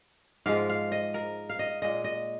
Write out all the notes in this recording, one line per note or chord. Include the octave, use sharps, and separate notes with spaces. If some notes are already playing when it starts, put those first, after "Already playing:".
G#2 F3 G#3 F5
F5
D#5
A#4
F5
D#5
A#2 G#3 D#5
D#5